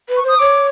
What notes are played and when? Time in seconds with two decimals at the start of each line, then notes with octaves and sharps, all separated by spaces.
0.09 B4
0.17 C#6
0.24 C5 D#6
0.39 C#5 D6